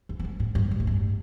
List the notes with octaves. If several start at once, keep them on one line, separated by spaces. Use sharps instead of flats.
E2
E2
F#2
A2
G2
A2
F#2
G2